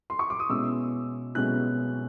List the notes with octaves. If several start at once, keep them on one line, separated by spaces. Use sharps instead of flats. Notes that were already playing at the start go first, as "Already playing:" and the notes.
C6
C#6
D6
D#6
B2 G#3 C#4 E4 E6
B2 G#3 C#4 E4 F#6